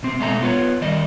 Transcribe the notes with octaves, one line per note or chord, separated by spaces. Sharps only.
B2 C4
B2 G#3 A3 C5 A#5
B3 F4 B4 C#5
D#3 G3 D5 D#5